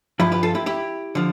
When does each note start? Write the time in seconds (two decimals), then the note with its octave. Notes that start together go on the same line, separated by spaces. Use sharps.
0.19 G2 F3 E4 G4
0.32 G4 B4
0.43 F4 A4
0.55 E4 G4
0.66 E4 G4
1.15 D3 F3